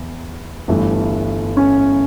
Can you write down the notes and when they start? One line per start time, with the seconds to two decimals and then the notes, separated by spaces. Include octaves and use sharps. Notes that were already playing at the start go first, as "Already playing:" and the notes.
Already playing: E2
0.68 G1 G2 E3 A3
1.57 C#4